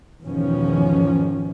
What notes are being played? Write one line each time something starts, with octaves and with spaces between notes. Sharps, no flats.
E2 G#2 B2 D#3 F3 C#4